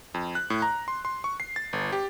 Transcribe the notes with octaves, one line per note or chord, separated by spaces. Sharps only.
F2
F#6
A2
A#5
C6
C6
C#6
C7
A6
G1
G4